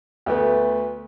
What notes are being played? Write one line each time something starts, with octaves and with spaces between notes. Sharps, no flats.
D2 A3 B3